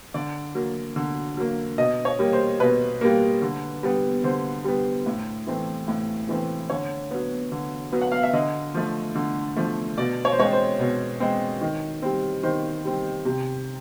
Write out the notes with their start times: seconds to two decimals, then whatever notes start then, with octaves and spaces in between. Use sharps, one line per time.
0.14 D3 D5
0.55 F#3 A#3
0.96 D3
1.37 F#3 A#3
1.78 B2 D#5
2.05 C#5
2.19 G3 A#3
2.33 C5
2.60 B2 B4
3.01 G3 A#3
3.42 D3
3.83 G3 B3
4.24 D3 C5
4.65 G3 B3
5.06 A2
5.47 E3 A3 C4
5.88 A2
6.29 E3 A3 C4
6.70 D3 C#5
7.11 F#3 B3
7.52 D3
7.92 F#3 B3
8.01 F#5
8.12 F5
8.23 E5
8.33 D3 D#5
8.74 F3 A3
9.15 D3
9.56 F3 A3
9.98 B2 D5
10.25 C#5
10.32 C5
10.38 G#3 C4 C#5
10.53 C5
10.80 B2
11.20 G#3 C4
11.61 D#3
12.02 G3 C4
12.43 D#3 C5
12.85 G3 C4
13.25 C3